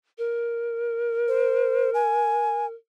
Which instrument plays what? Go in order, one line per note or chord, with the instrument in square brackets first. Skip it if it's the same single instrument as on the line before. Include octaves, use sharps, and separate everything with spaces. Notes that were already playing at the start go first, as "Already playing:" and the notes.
[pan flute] A#4
[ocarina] C5
G#5